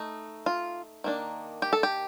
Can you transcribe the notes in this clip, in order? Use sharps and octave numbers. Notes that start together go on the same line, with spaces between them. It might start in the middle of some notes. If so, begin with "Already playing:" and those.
Already playing: A3 D#4
F4
D#3 A#3 D4
G4
A4
G4